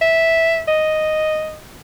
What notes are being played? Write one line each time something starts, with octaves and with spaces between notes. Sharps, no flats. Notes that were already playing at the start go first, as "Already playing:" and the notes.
E5
D#5